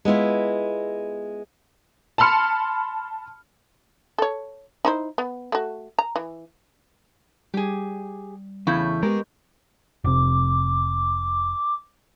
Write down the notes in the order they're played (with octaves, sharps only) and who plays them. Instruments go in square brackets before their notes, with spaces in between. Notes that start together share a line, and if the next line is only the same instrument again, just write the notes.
[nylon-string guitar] G#3 B3 E4 F4
[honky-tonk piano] A5 B5 C6 F6 C#7
[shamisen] A4 C#5
D#4 E4 C5
B3
A3 F#4
A#5
E3
[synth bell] G3 [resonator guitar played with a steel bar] G4 G#4
[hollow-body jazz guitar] E2 [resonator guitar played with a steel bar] A2 C#3 E4 [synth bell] C#6 G6
[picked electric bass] G#3 [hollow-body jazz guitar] B3 G4 A#4
[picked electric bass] F1 C3 [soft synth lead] D6